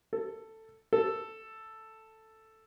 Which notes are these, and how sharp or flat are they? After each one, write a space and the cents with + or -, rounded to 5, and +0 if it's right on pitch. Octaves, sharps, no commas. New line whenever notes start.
A4 +10
A4 +5